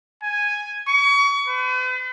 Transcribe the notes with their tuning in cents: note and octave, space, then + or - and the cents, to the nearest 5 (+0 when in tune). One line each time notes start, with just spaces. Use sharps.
G#5 -5
C#6 +30
B4 +45